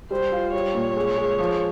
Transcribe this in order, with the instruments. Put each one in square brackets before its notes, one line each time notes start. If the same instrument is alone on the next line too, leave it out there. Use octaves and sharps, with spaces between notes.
[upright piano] G3 [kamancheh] C5
[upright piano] F4
[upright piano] G3 [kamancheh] C#5
[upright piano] A#2
G#3
G#3
F3